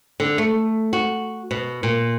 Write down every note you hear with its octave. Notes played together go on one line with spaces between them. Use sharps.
D3
A3
F#4
B2
A#2